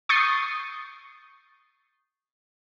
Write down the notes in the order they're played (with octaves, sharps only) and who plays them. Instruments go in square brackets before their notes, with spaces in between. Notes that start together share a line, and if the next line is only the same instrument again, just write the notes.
[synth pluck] C#6 D#6 G6 A6 C7